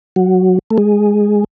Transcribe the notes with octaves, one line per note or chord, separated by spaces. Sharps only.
F#3
A3
G#3